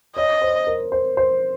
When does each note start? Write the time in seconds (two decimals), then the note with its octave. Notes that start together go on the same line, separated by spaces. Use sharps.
0.16 C#5 D#5
0.42 C5
0.67 A#4
0.92 C5
1.17 C5